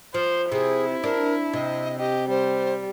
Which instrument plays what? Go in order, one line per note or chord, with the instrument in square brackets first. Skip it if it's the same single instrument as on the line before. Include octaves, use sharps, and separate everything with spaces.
[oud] F3 [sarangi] C5
[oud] C3 [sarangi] E4 [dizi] G#4
[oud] D4 [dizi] A#4
[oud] C3 [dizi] D#5
[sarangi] G4 [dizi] D#5
[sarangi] G3 [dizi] C5